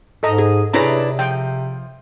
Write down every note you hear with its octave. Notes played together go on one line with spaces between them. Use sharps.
G#2 A4 D#5 A#5
G#4
C3 D4 E4 G#4 B4 C#5 A#5
F3 G5